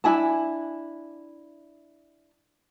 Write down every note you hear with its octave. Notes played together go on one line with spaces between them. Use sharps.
D4 E4 G#5 A5